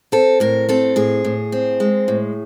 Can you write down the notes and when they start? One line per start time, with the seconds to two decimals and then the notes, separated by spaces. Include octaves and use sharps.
0.12 C4 A4
0.40 A2 A#4
0.69 C4 A4
0.96 A2 G#4
1.25 A2
1.52 C4
1.80 G#3
2.08 A2